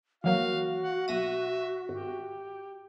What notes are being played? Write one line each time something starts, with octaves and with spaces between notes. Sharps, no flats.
E3 F#3 A#3 F#4 F5
F#5
B1 E5 A#6 D#7
G#1 G4